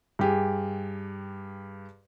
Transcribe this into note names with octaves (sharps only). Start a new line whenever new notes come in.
G2 G4 G#4